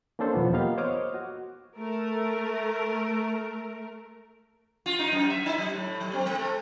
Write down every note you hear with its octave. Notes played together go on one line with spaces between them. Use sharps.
A#3 C#4 D4 A4 C5
E2 B2 F3 F#3 B3
A#3 B3 F4 G4 D#5 F5
C5 C#5 D#5 D6 D#6 F6
F#4
A3 A#4
F4
D#4
F#2
E5
D#4
F#3
A2
F#3
C4
G#3
A4